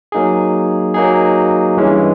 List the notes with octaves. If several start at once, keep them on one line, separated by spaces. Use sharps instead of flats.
F#3 A#3 D#4 G#4
F#3 A#3 D#4 G#4
G2 E3 G#3 C#4